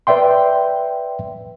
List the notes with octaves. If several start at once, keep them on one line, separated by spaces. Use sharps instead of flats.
B4 D5 E5 G5 C6